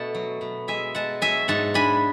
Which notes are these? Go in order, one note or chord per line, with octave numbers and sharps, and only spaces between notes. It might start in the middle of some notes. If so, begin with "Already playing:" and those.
Already playing: B2 A3 F#5 A5
F#3
B2
G#3 E5 G#5
G#3 F#5 A5
F#3 E5 G#5
G#2 F#5 A5
D4 G#5 B5